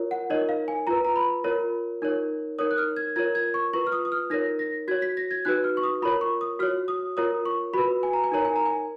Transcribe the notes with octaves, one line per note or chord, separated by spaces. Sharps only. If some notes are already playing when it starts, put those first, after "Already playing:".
Already playing: F4 A#4 C#5
F#5
D#4 A#4 C#5 D#5
F5
G#5
F4 B4 A#5
A#5
B5
F4 A#4 C#5
D#4 A#4 C#5
D#4 A#4 C#5 D#6
F#6
F6
G#6
F4 A#4 C#5 G#6
G#6
C#6
F4 B4 C#6
F6
D#6
D#6
F6
D#4 A#4 C#5 A#6
A#6
F#4 C#5 G#6
B6
A#6
G#6
D#4 F#4 B4 F#6
F6
C#6
D#6
F4 A#4 C#5 B5
C#6
D#6
F#4 C#5 F6
D#6
F4 A#4 C#5 D#6
C#6
F#4 B4 B5
G#5
A#5
G#5
D#4 A#4 C#5 A#5
G#5
A#5
G#5